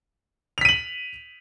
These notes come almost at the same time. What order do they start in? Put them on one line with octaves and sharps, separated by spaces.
F7 B6 D#7 F#7